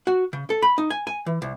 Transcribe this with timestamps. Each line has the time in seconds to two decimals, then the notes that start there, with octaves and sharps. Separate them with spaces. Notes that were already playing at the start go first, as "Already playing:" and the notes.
0.07 F#4
0.33 C#3
0.50 A4
0.62 B5
0.78 D#4
0.90 G#5
1.07 G#5
1.26 E3
1.42 C2